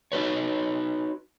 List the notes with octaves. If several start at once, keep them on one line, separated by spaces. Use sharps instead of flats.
D#4 F#4 B4 C#5